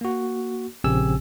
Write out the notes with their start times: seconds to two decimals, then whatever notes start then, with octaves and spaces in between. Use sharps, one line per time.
0.01 A#3 F#4
0.84 A#1 C#3 C4 G4 G#5 E6